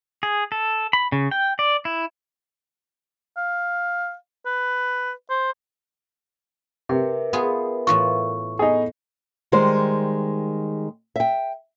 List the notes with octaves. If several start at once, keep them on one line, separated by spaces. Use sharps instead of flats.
G#4
A4
B5
C#3
G5
D5
E4
F5
B4
C5
C3 A#4 B4 E5
B3 F4 G#4
A2 E3 F4 C#6
B3 D#4 G#4 A4 D#5
D#3 G3 G#3 C5
E5 G5